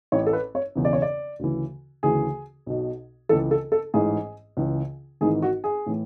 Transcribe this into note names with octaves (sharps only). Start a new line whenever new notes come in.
A1 A2 E3 C#5
A4
B4
C#5
E1 E2 C#3
D5
C#5
D5
D2 C#3 E3
D2 C#3 E3 G#4
B1 B2
C#2 C#3 E3 A4
A4
A4
A1 G#2 E3 G#4
C#2 C#3 E3
G#1 G#2 E3 G#4
F#4
G#4
A2 E3